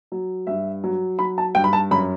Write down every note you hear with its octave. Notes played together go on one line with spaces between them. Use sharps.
F#3
G2 E5
F#3
F#3 B5
A5
G2 G5
B5
A5
F#2 B5